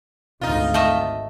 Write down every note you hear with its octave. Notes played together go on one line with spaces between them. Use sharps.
G#1 D2 D#4 F4
A3 D#5 E5